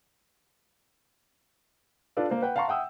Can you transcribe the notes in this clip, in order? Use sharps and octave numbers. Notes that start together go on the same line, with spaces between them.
D4 F4 A4 B4 D5
A#3 C5
B4 F#5 G5
F5 F#5 A5 A#5 C6 C#6
E5 F#5 G5 D#6 E6